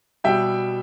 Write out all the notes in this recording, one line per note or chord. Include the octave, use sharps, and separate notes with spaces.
B2 G3 E5 G5